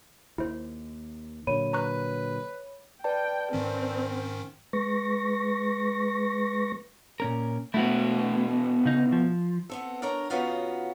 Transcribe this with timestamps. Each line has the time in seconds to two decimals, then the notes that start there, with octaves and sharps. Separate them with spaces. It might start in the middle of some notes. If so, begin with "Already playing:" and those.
0.38 D#2 E4 C5
1.47 A#2 D3 F#3 C#5 B5 D#7
1.73 B4 A#5 C#6 F#6
3.04 B4 D5 G5 A5
3.53 G#2 D#3 C4 C#4
4.73 G#3 B4 C#6 A#6
7.20 A#2 C#4 A#4
7.74 B2 A3 E4 F#4 B4
8.85 C#3 D#4
9.12 F3
9.70 B3 C4 A4
10.02 D4 A#4 C#5 D#5 A#5
10.30 C#3 B3 C#4 D#4 F4 F#4